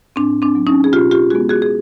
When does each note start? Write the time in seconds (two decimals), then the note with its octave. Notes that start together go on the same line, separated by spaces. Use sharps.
0.16 A2 C4 D4
0.42 C4 D4
0.55 F#3 B3
0.67 C#4 D#4
0.84 G#4
0.93 B2 F4 G4
1.11 F4 G4
1.30 G#3 B3 F#4 G#4
1.49 F#4 G#4
1.62 G#4